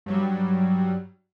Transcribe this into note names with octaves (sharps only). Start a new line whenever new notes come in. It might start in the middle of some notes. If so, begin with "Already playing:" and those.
G2 F#3 G3